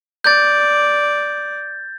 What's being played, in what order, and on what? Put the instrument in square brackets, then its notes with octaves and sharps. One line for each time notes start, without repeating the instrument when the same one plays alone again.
[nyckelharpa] D5 [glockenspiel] G6 A6